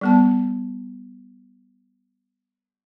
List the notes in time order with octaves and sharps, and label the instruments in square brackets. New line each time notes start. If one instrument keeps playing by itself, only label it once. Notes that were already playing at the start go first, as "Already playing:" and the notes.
[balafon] G3 B3 A5